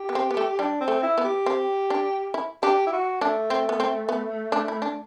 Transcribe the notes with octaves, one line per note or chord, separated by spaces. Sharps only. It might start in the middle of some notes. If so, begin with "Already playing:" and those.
Already playing: G4
B3
C4
B3
A3
G3 D4
C4
A3
E4
B3
G4
C4
D4
E4
D4 G4
E4
F#4
A3 D4
C4
B3
C4
B3
D4
E4
D4